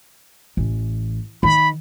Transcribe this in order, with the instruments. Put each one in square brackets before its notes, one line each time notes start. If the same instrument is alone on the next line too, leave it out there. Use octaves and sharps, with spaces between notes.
[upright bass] A1
[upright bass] D#3 [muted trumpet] B5